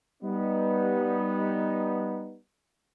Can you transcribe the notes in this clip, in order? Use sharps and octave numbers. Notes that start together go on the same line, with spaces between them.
G3 B3 D#4